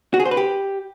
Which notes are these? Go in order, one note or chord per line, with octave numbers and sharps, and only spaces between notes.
F#4
G#4
C5
B4
G4